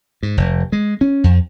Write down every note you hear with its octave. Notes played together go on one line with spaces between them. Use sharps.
G#2
F1
G#3
C#4
F2